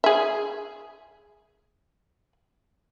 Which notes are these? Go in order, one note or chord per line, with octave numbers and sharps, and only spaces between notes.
G#4 E5